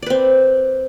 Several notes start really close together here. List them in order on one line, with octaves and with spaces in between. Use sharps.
D5 B4 C4